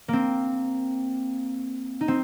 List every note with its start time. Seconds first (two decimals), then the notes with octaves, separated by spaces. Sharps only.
0.08 A#3 C4
2.01 D#4
2.08 C4